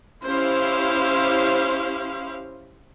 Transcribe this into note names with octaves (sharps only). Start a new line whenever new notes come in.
C#4 E4 G4 C5 F5